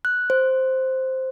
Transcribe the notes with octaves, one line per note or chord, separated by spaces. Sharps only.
F#6
C5